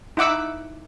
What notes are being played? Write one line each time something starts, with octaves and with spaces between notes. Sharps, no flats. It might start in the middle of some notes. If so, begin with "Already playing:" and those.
D#4 E4 F#5 D6 E6